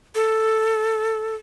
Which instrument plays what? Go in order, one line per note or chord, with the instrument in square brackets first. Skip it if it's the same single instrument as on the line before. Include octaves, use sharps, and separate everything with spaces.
[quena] A4